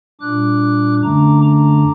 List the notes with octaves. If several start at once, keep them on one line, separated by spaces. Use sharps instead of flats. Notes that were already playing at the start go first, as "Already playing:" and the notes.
A#2 G3 D4 D6 F#6
F#2 D3 A3 D4 A#5 D6
A#5 D6